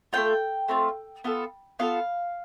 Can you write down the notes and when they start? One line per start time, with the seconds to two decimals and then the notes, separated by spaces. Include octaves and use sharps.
0.13 A3 C4 F4 G5
0.68 A3 C4 F4
1.24 B3 F4 A4
1.79 B3 F4 A4 F5